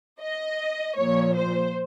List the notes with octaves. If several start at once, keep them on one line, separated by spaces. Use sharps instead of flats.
D#5
A#2 F3 C#5
C5